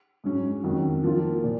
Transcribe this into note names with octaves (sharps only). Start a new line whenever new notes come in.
G#2 F#3 C#4
F2 D#3 F#3 C#4 F#4
F3 A#3 F4
A#2